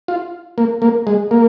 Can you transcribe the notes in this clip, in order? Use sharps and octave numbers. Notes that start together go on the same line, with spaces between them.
F4
A#3
A#3
G#3
A#3